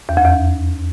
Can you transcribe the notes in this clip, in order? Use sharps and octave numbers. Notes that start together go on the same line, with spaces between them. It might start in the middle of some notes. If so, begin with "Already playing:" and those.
E2
F2
E2